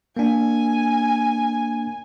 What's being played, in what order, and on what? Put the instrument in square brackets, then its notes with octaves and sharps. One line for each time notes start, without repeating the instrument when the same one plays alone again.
[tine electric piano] A#3 D4 [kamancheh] G#5